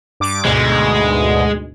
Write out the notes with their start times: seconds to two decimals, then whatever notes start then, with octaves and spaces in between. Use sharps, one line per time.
0.20 G2 D6
0.45 D2 G#2 B2 G#3